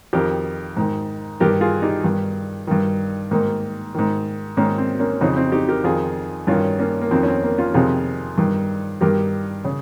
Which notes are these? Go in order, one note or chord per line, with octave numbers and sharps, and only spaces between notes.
F2 D#3 G4 A#4
G#2 D#3
G2 D#3 G4 A#4
F4 G#4
D#4 G4
G2 D#3
G2 D#3
G#2 D#3 A#3
G#2 D#3
G#2 D#3 A#3 C#4
C4
A#3 C#4
F2 C#3 C4 D#4
C4 D#4
D#4 G4
G4 A#4
F2 D#3 F4 G#4
G2 D#3 C#4 F4
A#3 C#4
A#3
F2 D#3 C4
C#4
C4
A#3
C#4 F4
F2 C3 D#3 F4 G#4
G2 D#3
G2 D#3 G4 A#4
C#3